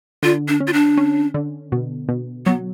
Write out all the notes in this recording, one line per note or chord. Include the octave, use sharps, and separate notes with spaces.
D3 F4
D4
C#4
F4
D4
C#4
D3
B2
B2
F#3 B3